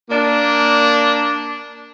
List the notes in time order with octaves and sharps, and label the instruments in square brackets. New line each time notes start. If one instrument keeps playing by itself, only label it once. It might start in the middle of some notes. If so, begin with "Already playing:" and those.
[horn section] A#3 D4